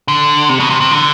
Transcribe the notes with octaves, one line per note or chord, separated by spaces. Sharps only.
D3
C3
B2
C3
C3
D3